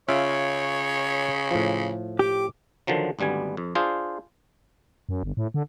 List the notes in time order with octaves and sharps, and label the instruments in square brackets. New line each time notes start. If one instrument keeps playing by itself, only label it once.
[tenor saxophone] C#3 [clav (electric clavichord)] C#4 F4 E5 [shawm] C#5
[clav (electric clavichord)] A2 F3
[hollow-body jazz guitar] G4 [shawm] D6
[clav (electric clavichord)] D3 D#3 F3 F#3
G#1 D2 G3 B3 G#5
F2
D4 F4 G#4 C5
[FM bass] F#2
G1
A2
D3